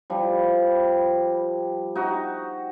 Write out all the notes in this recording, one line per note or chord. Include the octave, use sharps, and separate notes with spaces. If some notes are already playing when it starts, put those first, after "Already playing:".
F3 G3
D#4 F#4